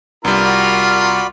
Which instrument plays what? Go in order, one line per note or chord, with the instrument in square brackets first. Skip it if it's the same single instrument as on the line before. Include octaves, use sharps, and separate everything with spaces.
[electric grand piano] C2 G3 [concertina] B3 D4 [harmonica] F4 A#4 A#5
[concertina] F#4 D5 B5